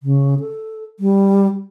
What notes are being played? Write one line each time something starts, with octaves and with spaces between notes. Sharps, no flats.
C#3
A4
G3